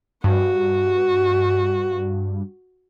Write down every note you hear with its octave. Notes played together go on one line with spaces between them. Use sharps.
G2 F#4